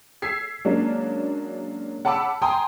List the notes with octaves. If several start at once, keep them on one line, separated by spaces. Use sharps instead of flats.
E6 G#6 B6 C7
F#3 G#3 A#3 C#4 D4
F#5 A5 B5 D6 E6
G5 G#5 A#5 C6 D#6